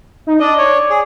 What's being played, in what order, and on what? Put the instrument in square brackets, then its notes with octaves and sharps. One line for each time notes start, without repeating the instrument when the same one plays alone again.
[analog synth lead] D#4
[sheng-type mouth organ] D4 D#5 [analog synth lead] D5
[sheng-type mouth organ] C#5
G#4